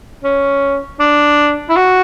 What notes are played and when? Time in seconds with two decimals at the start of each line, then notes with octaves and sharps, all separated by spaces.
0.24 C#4
1.00 D4
1.69 E4
1.77 F#4